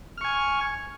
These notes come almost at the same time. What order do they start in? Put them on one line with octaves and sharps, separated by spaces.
F6 C#6 G#5